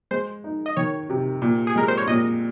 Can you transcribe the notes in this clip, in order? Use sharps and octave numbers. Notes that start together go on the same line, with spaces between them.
G#3 C5
D#4
D#5
D#3 C#5
C3
A#2
G#4
G#3 A#4
C5
C#5
A#2 D#5